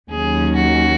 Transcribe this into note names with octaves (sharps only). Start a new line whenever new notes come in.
D#2 D#3 F#3 C#4 G#4
F#4